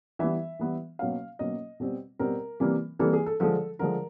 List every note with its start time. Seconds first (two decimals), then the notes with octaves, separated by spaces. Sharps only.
0.19 E3 G3 B3 E5
0.59 E3 G3 B3
0.99 B2 F#3 A#3 C#4 F5
1.39 B2 F#3 A#3 C#4 D#5
1.80 B2 G3 C4
2.19 B2 G3 C4 A#4
2.60 C3 E3 G3 A#3
2.99 C3 E3 G3 A#3 A4
3.13 G#4
3.26 A4
3.40 D3 F3 G#3 A4
3.79 D3 F3 G#3 A#4